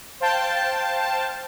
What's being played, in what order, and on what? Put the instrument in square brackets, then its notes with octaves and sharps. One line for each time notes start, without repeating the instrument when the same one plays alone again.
[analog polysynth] C5 F5 G5 A5